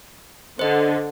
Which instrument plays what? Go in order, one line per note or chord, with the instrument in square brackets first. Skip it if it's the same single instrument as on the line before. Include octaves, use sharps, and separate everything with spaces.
[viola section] D3 [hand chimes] C5 D#5